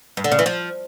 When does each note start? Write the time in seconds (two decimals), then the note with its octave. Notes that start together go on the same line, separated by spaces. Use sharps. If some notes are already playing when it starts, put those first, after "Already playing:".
0.17 G2
0.24 D3
0.32 C#3
0.39 E3
0.46 F3